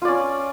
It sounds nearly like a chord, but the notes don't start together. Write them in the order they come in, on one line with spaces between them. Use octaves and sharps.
F4 D5 C#4